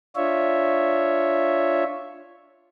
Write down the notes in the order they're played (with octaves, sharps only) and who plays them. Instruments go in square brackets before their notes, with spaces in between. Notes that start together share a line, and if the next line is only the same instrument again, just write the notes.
[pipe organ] D4 F4 C#5 E5